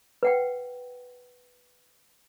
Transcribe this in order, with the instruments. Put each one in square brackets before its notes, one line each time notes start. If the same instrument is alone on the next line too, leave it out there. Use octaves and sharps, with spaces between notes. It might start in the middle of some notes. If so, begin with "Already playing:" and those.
[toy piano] B4 F#5 G5